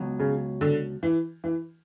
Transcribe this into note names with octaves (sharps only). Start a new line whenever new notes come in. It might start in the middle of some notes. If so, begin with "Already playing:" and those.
Already playing: C#2 B2 F#3
C#3
D3
E3
E3